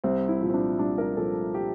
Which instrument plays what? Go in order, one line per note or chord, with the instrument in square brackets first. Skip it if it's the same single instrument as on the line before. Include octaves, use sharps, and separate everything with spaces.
[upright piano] C2 C4
E4
A#2 F3
C4
D4
C2 D4
A#4
A#2 F3 A4
G4